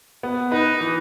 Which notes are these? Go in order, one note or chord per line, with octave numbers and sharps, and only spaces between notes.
B3
D#4 B4
E3